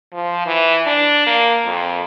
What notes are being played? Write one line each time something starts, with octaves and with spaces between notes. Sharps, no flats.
F3
E3
D4
A#3
F2